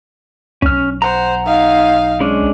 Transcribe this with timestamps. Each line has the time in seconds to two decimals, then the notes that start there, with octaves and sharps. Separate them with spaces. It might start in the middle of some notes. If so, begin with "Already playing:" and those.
0.62 B1 C#4 F6
1.02 C5 F#5 A#5
1.46 D#4 F5
2.20 G#3 C#4 D4